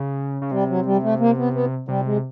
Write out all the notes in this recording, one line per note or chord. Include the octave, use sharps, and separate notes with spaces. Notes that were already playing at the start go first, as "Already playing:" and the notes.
Already playing: C#3
C#3
C3 G3
F#3
G3
A3
A#3
B3
B3
C3 G3
G#3